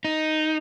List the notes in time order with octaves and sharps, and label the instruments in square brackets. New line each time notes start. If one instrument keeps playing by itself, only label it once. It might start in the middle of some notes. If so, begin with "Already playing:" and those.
[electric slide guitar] D#4